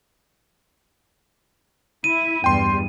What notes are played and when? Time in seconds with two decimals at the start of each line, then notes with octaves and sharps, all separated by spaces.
2.04 E4 D#7
2.44 E2 G2 G3 G5 C6